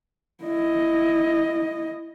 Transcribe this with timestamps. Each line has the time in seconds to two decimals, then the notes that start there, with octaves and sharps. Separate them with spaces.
0.44 E4 D#5